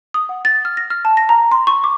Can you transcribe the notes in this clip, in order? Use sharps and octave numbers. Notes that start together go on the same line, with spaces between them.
D#6
F#5
A6
F6
A#6
F6
A5
A#6
A#5
C6
C#6
D6